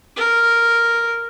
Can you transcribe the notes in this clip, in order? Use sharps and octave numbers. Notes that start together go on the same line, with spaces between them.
A#4